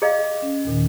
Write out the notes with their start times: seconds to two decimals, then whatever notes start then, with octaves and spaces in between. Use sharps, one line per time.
0.02 G#4 D#5 F5
0.42 C#4
0.65 D#2 A#2 D#3